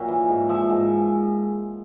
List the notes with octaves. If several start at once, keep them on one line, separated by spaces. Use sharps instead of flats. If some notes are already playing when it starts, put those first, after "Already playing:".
Already playing: A#2 F#3 E5
E3
G#2
F3 E5
G#2